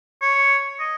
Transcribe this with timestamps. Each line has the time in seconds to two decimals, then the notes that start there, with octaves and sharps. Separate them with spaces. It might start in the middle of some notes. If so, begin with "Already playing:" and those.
0.22 C#5
0.80 D#5